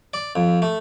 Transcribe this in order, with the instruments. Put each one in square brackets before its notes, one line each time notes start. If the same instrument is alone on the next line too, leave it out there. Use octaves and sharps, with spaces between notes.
[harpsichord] D5
F2
A3